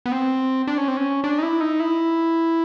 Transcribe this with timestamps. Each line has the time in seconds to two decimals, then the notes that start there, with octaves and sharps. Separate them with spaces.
0.06 B3
0.12 C4
0.67 D4
0.78 C#4
0.88 C4
0.97 C#4
1.24 D4
1.39 D#4
1.43 E4
1.61 D#4
1.80 E4